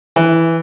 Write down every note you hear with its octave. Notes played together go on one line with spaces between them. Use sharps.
E3